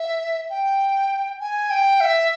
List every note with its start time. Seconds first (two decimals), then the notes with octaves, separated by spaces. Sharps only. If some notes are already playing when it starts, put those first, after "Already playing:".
Already playing: E5
0.50 G5
1.40 G#5
1.70 G5
2.00 E5